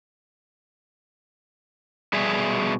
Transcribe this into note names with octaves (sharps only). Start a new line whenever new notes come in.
B2 G3 G#4 E5